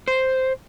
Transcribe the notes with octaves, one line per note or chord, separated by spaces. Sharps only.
C5